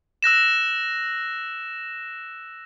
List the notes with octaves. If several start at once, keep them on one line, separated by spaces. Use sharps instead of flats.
E6 F#6 A#6 E7